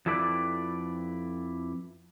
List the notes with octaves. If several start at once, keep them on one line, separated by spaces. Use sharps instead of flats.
F2 F3 E4 A4 B4 D5